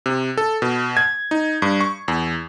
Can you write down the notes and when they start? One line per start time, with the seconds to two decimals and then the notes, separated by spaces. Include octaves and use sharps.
0.06 C3
0.37 A4
0.62 B2
0.97 G#6
1.31 D#4
1.62 G2
1.81 C#6
2.08 E2